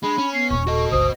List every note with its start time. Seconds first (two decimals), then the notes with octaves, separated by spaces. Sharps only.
0.03 G#3 D4 B5
0.18 C#4
0.34 B3 C7
0.50 D#1 A#2 C#6
0.67 F#4 A4 D#5
0.91 G1 C#2 C5 D#6